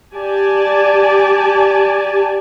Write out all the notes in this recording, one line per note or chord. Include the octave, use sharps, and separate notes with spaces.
G4 D5 G#5 A5